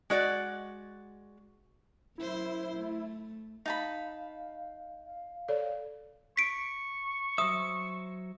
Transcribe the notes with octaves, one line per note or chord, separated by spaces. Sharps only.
G#3 F#4 D5
F#2 E4 C5
A3
D#4 F5 A5 B5
F5
A4 C#5 D5
C#6 B6 D7
F#3 C5 E5 D#6